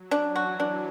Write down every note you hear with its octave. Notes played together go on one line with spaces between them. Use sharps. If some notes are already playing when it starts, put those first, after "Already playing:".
Already playing: F#3
D4
E3 F#4
D4